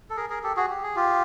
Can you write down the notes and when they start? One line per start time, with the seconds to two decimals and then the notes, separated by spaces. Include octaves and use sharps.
0.10 A4
0.17 G#4 A#4
0.30 G#4 A#4
0.43 G4 A4
0.56 F#4 G#4
0.70 G4
0.83 G#4
0.96 F4 G4